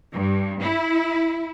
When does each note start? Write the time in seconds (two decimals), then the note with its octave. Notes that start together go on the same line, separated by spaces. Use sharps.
0.12 G2
0.60 E4